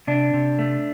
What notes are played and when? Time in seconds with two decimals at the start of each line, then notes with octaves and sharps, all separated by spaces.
0.07 C3 D4
0.34 C3
0.59 A3